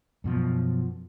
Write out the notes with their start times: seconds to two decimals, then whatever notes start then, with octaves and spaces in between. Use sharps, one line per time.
0.24 F#2 B2 F3